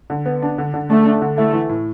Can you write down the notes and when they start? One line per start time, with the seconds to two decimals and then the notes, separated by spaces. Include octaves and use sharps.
0.10 D3
0.26 B3
0.42 D4
0.58 D3
0.74 D3
0.90 A3 D4
1.06 D4
1.22 D3
1.37 A3 E4
1.53 E3
1.69 A2